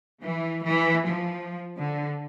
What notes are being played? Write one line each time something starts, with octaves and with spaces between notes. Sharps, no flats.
E3
E3
F3
D3